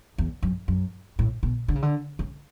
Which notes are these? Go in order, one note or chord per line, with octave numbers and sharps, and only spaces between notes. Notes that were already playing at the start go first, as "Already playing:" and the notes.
E2
F#2
F#2
A2
B2
D3
C#3
D3
C#3